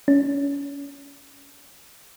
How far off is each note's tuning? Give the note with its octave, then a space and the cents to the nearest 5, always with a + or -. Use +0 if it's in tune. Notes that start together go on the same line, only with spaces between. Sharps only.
C#4 +25